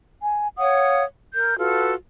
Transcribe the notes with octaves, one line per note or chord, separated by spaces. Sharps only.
G#5
C#5 F5 F#5 D#6
A#4 G6
F4 F#4 A4 B4